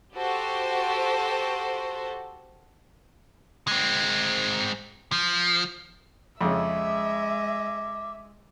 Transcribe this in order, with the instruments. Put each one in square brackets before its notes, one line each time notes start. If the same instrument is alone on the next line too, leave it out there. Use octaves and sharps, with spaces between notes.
[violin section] F#4 G4 A4 C5
[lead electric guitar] G#3 C4
F3
[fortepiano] F2 C#3 [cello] G#3 [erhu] E5 [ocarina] D6